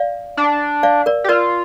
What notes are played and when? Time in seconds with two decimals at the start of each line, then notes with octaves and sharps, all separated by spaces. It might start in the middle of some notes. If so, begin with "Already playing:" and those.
Already playing: D5 F5
0.37 D4
0.83 D5 F5
1.06 A#4 D5
1.24 G4
1.28 F4 A#4 D5